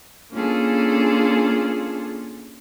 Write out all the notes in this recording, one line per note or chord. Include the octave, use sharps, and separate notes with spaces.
A#3 C#4 D4 F4 G#4 A4